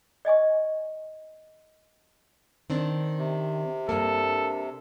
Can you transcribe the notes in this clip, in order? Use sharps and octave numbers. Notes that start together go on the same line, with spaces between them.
D5 D#5 G#5 C#6
D#3 C4 D4
C3
G2 A#3 A4